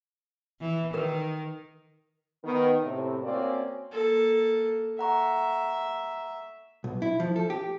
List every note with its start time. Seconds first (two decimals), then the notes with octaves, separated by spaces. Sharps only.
0.61 E3
0.94 D#3 A#4 B4
2.44 D#3 B3
2.83 A2 C3
3.23 A#3 C4 C#4 F#4 D5
3.92 A#3 A4
4.99 E5 F#5 A#5 C#6
6.84 B1
7.02 E4
7.20 F3
7.36 A4
7.50 G4